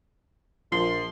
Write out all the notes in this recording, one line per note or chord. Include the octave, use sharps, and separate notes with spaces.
A#1 F3 C6